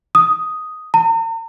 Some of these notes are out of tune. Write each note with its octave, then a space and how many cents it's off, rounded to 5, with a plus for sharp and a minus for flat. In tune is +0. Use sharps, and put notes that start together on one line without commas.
D#6 +5
A#5 -45